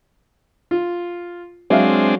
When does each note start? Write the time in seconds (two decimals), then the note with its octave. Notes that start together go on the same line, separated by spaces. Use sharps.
0.71 F4
1.70 F#3 G#3 C4 D4 C5 E5 F5